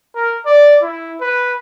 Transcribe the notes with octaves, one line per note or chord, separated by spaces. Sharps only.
A#4
D5
E4
B4